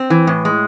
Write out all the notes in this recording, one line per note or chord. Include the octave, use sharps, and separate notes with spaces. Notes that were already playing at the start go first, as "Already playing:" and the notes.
Already playing: C4
E3
A2
G#3